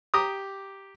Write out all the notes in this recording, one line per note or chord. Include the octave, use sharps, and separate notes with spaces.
G4 A#5 D6 D#6